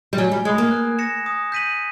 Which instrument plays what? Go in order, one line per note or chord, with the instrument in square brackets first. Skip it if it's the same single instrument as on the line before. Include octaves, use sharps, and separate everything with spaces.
[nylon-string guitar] G3
[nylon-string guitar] F#3 [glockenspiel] G#5
[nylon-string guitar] G3
[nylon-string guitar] G#3 [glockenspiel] B5 D#6 G#6
[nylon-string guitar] A#3
[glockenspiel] F#6
A#6 C#7 E7
D#6
G6 B6 D#7 F#7